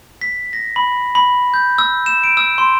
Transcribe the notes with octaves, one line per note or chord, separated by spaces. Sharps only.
B6
A#6
B5
B5
G6
E6
E7
D7
E6
C6